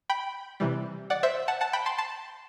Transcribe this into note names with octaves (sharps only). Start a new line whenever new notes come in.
G5 B5
C3 E3 G3
D5 F#5
C5 E5
F#5 A5
F#5 A5
G5 B5
A5 C6
A5 C6